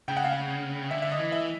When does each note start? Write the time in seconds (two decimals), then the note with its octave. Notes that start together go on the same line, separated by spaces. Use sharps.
0.08 C#3 G5
0.17 F#5
0.24 F5
0.33 F#5
0.91 D3 E5
1.02 E5
1.12 D#5
1.19 E3
1.32 E5